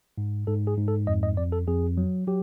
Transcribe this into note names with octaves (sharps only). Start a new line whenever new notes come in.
G#2
G#2 A4
G#4
G#2
A4
F2 D#5
D#5
F2 D5
A4
F2 G#4
F#3
F#3 G4